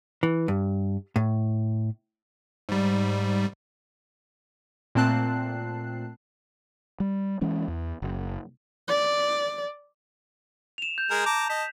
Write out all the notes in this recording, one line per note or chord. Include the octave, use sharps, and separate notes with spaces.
E3
G2
A2
G#2 G3
A#2 A3 C4 A5 F#6 C7
G3
E3 G#3 C#4
E2
F#1
D5
E7 F7
G6
G#3 G#4 A#4
A5 A#5 D6
D#5 A5 B6